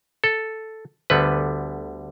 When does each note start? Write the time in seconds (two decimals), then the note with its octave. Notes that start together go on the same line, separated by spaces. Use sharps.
0.24 A4
1.10 D2 D3 G3 B3 B4